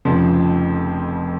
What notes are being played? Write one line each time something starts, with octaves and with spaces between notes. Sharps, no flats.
F1 F2 C#3 F3